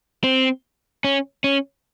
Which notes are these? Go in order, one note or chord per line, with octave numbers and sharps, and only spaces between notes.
C4
C#4
C#4